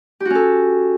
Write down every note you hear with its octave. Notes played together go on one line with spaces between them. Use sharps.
C#4 F#4 G4 A4